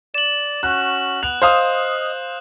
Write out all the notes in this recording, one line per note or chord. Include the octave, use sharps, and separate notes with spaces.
D5 E7 F#7
C#4 F#4 F#6
B3 F#6 F7
C5 D#5 F5 D#6